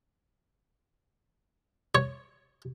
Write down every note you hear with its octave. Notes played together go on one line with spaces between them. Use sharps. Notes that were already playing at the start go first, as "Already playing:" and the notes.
C#5